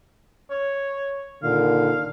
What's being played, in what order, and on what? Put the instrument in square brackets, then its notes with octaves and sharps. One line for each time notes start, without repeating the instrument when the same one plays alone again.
[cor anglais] C#5
[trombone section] A#2 D3 D#3 [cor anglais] F5